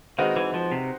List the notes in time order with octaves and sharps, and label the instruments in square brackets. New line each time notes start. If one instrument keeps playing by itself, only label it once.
[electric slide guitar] D#3 [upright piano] G#3 C4 D#4 F#4 B4
[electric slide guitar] E3
F3
C3